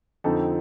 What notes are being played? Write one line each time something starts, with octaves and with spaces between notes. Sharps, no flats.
F2 D3 F3 C4 D#4 A4